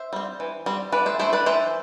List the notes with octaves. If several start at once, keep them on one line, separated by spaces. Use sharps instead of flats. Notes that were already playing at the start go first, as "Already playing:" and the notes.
Already playing: C5 E5
G3 C4
E3
G3 C4
E3 B4 D5
C5 E5
A3 E4 C5 E5
B4 D5
E3 C5 E5